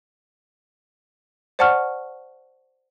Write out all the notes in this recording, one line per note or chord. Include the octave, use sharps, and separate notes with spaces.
C5 D5 F#5 A5 C#6 F6